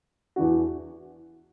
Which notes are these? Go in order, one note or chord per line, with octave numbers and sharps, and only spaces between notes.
E2 E3 D4 F#4